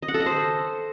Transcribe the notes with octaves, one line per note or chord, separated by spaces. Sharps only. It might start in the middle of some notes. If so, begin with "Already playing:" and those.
D#5
F#5
A4
D#5
C5